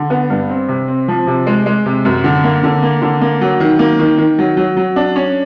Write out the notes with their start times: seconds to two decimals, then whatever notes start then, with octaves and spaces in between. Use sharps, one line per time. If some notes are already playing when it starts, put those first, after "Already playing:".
Already playing: D3
0.10 B3
0.30 G2
0.49 C4
0.68 C3
0.88 C4
1.08 F3
1.27 C3
1.47 G#3
1.66 G#3
1.86 C3
2.05 F#2
2.24 D3
2.44 A#3
2.63 D3
2.83 A#3
3.02 D3
3.21 A#3
3.41 F#3
3.60 D#3
3.79 A#3
3.99 D#3
4.18 D#3
4.39 F#3
4.57 F#3
4.77 F#3
4.96 D4
5.16 C#4